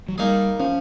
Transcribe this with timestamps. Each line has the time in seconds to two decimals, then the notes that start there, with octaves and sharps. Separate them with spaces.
0.09 F#3
0.18 G3 A#3 D#4 G#4
0.60 F3 C#4